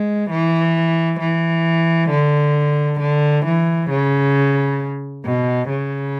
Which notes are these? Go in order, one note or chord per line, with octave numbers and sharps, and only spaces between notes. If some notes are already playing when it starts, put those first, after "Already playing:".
Already playing: G#3
E3
E3
D3
D3
E3
C#3
B2
C#3